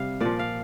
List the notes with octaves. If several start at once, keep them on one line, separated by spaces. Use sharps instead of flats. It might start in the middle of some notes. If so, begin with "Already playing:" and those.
Already playing: C3 G3 F5
A#2 F3 D5
F5